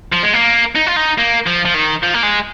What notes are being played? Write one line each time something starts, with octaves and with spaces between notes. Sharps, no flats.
F3
G#3
A#3
D#4
F4
D#4
A#3
F3
F3
D#3
F3
A#3
G#3